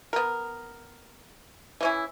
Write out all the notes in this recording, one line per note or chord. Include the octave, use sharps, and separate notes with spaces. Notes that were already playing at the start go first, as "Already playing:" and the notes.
B3 A#4
E3 C#4 E4